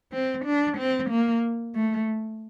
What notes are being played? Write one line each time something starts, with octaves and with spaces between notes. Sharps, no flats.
C4
D4
C4
A#3
A3